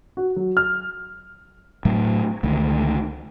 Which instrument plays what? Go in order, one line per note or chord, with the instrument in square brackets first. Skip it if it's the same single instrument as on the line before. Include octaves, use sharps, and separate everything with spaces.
[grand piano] F#4
F#3
F6
[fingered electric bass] A2 F#3 A3
C#2 D3 D#3 A3